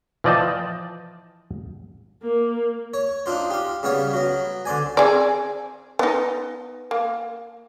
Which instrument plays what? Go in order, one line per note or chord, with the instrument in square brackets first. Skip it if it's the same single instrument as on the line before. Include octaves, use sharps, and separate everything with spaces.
[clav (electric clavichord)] E3 F3 D5 D#5 G5 A5
[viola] A#3
[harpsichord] C#5
D4 D#4 F4 C5
G4 F5
C#3 G3 B3 C#5 F5
F#3 B3
D3 C5 D5 G#5
[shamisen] C4 G#4 D5
B3 D#4
A#3